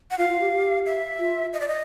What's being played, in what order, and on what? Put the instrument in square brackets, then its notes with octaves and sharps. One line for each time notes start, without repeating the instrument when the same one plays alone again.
[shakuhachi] F#5
[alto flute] F4 [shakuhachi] F5
[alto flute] F4
G4
G4
[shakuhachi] E5
[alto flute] F4
[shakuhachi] D#5
D5
D#5